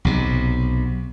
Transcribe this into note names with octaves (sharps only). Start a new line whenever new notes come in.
B1 C3